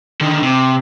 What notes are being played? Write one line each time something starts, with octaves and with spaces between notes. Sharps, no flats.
D3 D#3
C3